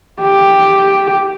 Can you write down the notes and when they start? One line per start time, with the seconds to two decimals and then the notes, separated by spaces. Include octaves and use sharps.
0.20 G4